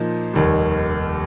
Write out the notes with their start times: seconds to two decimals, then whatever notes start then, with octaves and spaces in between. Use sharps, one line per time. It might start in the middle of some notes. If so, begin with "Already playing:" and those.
Already playing: A#2 F3 A#3 D#4
0.34 F1 D#2 D#3 G3